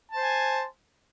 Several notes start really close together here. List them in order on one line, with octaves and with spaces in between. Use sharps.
A5 C5 G#5